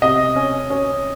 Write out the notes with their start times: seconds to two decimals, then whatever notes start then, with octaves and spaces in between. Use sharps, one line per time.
0.02 C3 D#5
0.36 C#4
0.70 C#4